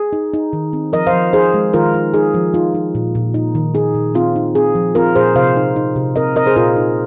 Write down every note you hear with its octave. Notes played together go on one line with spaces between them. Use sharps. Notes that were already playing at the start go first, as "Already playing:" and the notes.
Already playing: G#4
D#4
D#4
D#3
C4
F3 A#4 D#5
C5 F5
F3
D#4 G#4 C5
G#3
D#3 F4 A#4
D#4
D#4 G#4
F3
D#4 F4
D#4
A#2
A#2
D#4
D#3
D#4 G#4
A#2
C4 F4
D#4
C4 G#4
F3
C4 F4 A#4
A#2 G#4 C5
C3 C5 F5
D#4
D#4
C3
C4 A#4 D#5
C4 A#4 D#5
G#4 C5
A#2 F4 A#4
D#4